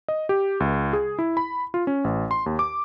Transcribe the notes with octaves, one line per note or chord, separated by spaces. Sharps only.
D#5
G4
C#2
G#4
E4
B5
F4
C#4
A1
C6
D#2
D6